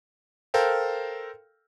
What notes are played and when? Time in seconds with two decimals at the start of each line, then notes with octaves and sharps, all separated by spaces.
0.54 A4 A#4 C5 F5 G5